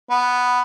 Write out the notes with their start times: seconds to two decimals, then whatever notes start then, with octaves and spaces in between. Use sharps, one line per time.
0.10 B3